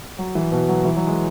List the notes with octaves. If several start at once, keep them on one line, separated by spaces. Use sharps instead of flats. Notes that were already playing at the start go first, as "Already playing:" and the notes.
F#3
E3
B2
F#3
E3
F#3
G#3